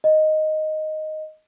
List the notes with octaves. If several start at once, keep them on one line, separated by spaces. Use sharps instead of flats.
D#5